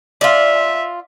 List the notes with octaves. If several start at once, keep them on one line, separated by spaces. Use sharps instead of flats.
F4 D5 E5